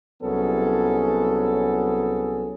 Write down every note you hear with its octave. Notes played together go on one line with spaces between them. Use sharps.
C2 F#3 B3 C#4 G#4 A4